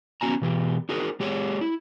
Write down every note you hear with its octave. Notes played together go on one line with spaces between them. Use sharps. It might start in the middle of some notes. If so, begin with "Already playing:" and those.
B3 C#4 F#4 G#5 A#5
B2 E3 G4
D#4 F#4 G#4 A#4 C5
G#3 G4 G#4 C#5
E4